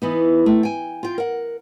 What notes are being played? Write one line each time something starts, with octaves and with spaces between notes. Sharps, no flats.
E3 B3 D#4
A3
G5 G#5
F4 G5
A#4 F#5